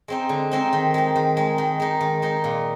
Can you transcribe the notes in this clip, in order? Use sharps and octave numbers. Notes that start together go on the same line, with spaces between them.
G#3 C4 D#4
D3
G#3 C4 D#4
D#3
G#3 D#4
D#3
G#3 D#4
D#3
G#3 D#4
D#3
G#3 D#4
A#2